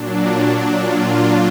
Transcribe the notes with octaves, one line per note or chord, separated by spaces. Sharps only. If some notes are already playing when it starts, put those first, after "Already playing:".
Already playing: A#2 F#3 D4
D4
F4